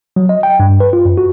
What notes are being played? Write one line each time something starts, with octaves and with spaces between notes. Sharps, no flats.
F#3
D#5
G5
G2
B4
F4
F#2
F#4